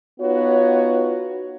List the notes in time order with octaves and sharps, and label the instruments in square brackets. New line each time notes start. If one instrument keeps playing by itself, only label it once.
[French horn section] B3 D#4 F4 F#4 B4 C#5